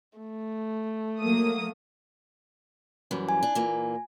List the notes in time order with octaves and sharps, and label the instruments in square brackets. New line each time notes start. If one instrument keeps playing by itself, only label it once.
[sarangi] A3
[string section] F#3 A#3 D#6
[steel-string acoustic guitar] F#2 E3 G3
[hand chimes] G#5
[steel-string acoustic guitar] D4
A#2 E3 A#3